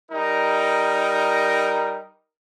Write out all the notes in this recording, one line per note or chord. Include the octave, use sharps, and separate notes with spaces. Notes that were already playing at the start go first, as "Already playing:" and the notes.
G3 D#4 A#4